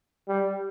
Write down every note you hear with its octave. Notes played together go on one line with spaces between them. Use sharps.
G3